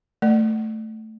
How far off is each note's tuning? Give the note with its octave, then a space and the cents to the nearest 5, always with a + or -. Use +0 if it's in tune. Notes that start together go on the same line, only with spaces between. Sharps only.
A3 +0 D5 +30